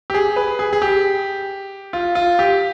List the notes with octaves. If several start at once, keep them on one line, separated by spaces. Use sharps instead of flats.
G4
G#4
B4
G#4
G#4
G4
F4
F4
G4